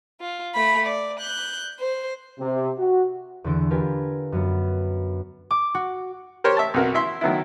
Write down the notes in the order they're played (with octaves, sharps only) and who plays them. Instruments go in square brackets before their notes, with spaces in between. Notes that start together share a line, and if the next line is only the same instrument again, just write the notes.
[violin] F4
A3 B5
D5
F#6 G6
C5
[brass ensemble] C3
F#4
[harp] E2 D3 D7
F4 G4 A#4 B4 G#5
F#2 F#3 B3
D6
F#4
[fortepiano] G4 A#4 C5 C#5
E5 A5
B1 F2 F#4 A#4
E4 E5 C6
D#3 F#3 B3 E4